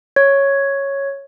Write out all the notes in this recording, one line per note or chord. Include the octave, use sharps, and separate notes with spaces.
C#5